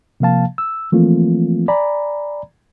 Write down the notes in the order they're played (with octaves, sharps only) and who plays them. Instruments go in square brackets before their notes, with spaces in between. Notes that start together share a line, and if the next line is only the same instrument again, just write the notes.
[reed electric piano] C3 F3 A#3 F5 A5
E6
E3 F3 A3 A#3 C4 F4
D5 G#5 A#5 B5